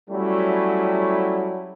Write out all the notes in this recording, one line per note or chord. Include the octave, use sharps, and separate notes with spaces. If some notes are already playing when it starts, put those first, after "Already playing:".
F#3 G3 A3 C#4 E4